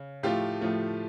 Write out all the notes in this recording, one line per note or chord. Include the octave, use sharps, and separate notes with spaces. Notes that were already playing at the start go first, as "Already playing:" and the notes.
Already playing: C#3
A2 F3 A3 F4 G4
A2 F3 A3